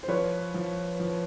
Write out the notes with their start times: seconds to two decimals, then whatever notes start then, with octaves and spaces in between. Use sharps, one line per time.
0.03 C5
0.08 F3 B4 C#5
0.54 F3
1.00 F3